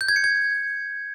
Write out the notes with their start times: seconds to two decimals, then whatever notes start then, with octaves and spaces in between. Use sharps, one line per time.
0.01 G6
0.08 G#6
0.16 C#7
0.24 G#6